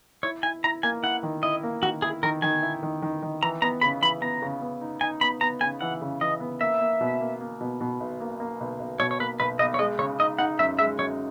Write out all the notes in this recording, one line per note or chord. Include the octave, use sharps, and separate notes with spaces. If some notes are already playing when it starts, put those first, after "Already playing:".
E4 C#5
E4 G#5
E4 A#5
A#3 G#5
E4 F#5
D#3
E4 D#5
A#3
D#3 F#4
E4 G#4
D#3 A#4
D#3 G#5
E4
D#3
D#3
D#3
E3 A#5
B3 A#5
C#3 B5
E3 B5
B3 A#5
C#3
B3
D#4
D#4 G#5
B3 B5
B3 A#5
C#3 G#5
E3 F#5
C#3
E3 D#5
B3
A#3 E5
A#3
B2
A#3
A#3
B2
B2
B1
A#3
A#3
B1
B1
B2 C#5
C#5
A#3 B4
B1 B4
B1 D#5
C#5
G#3 D#5
C#3 C#5
D#4 D#5
D#4 F#5
F#2 E5
G#3 E5
F#2 C#5